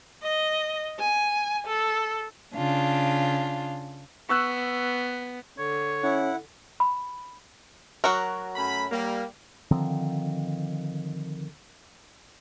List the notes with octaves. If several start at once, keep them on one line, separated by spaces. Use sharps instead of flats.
D#5
G#5
A4
C#3 D4 F4
B3 C#6 E6 F#6
D3 C#5
C#4 E4 F#5
B5
F#3 F#4 A#4
F#2 A3 B5
G3 A#3
D3 D#3 F3 C4